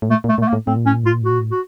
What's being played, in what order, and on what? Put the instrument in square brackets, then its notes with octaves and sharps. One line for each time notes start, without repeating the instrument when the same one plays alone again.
[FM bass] A2
[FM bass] A#2 [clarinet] A3
[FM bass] A#2
[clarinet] A3
[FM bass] A#2
[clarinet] A3
A#3
[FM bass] A2
[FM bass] A2 [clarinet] C4
[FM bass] A#2
[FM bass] A2 [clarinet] C#4
[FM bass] A#2
[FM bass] A2 [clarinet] F4
[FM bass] A#2
[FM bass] A2 [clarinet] F#4
[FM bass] A#2
A2
[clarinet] F#4